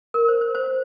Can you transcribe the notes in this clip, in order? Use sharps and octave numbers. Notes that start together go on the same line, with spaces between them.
A#4
C5
C5
C5